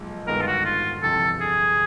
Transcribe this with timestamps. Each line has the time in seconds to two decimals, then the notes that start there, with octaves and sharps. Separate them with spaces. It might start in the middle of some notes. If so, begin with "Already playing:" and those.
Already playing: B1 A#2 F3 G#3
0.27 G1 G2 D#3 G#3 B3 A#4
0.41 F4
0.47 F#4
0.65 F4
1.03 G1 F2 C3 E3 A4
1.41 G#4